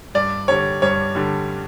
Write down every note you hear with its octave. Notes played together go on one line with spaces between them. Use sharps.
G2 D5
D3 G3 C#5
G2 C#5
D3 G3